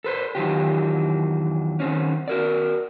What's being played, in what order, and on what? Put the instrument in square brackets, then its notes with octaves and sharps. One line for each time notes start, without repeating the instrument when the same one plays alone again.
[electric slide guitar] A4 B4 C5
E2 D#3 E3 F#3 F4 G4
D#3 C4 C#4
F#4 A#4 D5